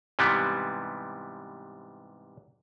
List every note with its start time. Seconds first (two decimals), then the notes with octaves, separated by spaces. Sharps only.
0.19 G#2 C3 E3 G3 B3